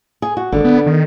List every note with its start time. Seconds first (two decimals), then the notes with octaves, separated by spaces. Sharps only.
0.22 G#4
0.37 F#4
0.52 G#1 D3
0.65 B3
0.86 D#3